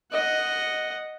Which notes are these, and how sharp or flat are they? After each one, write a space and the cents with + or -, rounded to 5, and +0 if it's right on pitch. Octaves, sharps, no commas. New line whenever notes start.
D#5 +0 F#5 +0